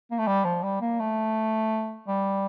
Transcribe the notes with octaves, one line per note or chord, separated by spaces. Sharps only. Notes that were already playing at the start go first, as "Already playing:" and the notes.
A#3
A3
G3
F3
G3
A#3
A3
G3